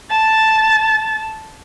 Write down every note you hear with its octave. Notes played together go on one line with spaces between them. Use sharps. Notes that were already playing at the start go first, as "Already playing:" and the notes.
A5 A6